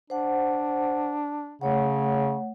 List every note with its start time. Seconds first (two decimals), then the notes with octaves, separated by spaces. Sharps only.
0.10 D4 C5 F#5
1.61 C#3 A3 C#5 F#5